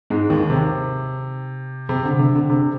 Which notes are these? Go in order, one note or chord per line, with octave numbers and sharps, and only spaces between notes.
G#2 G#3
D#2 D#3
C3
C3
D3
C3
D3
C3